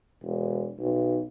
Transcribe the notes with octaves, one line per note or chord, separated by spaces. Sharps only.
E1
B1